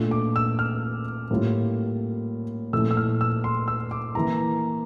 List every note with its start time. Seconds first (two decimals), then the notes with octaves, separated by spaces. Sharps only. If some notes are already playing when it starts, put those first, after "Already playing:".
Already playing: A#2 A3 D4 F4
0.11 D6
0.36 E6
0.59 F6
1.31 A2 G3 A#3 F4
2.73 A#2 F3 A3 E4 E6
2.91 E6
2.97 F6
3.21 E6
3.44 C6
3.68 E6
3.91 D6
4.15 E3 A#3 E4 A#5